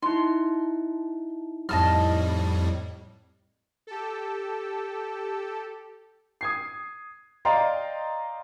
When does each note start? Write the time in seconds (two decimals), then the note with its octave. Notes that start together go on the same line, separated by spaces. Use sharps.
0.03 D#4 E4 C6
1.69 F2 A2 G3 D#5 A5 F6
3.87 G4 A4
6.41 D#6 G#6 C7
7.45 D5 D#5 F5 G5 A#5 C6